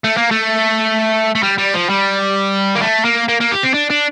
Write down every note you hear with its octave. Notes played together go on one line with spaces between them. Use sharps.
A3
A#3
A3
A3
G3
G3
F3
G3
A#3
A3
A#3
A#3
A#3
G4
C4
D4
D4